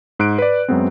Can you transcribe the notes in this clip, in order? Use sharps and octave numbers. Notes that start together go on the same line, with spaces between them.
G#2 F#6 D7
B4 D5
F#2 F#3 G#3 B3 C4